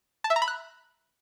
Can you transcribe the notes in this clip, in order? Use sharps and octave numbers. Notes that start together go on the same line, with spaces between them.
A5
E5
A#5
B5
F#6